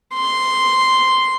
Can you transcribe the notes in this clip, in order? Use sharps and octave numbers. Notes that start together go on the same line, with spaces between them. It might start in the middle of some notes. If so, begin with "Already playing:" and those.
C6